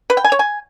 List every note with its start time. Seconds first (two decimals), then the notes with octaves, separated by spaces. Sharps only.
0.10 B4
0.17 G5
0.24 G#5
0.32 C#5
0.39 G#5